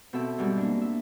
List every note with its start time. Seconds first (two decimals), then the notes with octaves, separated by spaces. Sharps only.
0.13 B2 C4 A4 E5
0.38 G#2 B2 G3 C4
0.57 A#3 D4
0.81 E5